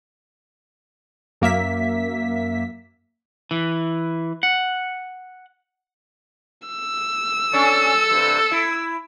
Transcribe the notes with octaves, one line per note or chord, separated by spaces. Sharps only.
F#2 A#3 E5 B6
E3
F#5
E6
C#4 D4 A4
G2 C3
E4